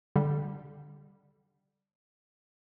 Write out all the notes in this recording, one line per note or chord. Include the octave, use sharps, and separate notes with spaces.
D3 G3